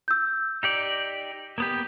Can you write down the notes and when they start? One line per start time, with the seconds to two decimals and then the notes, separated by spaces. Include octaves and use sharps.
0.08 E6 G6
0.63 D#4 G4 D5
1.58 A#3 B3 G4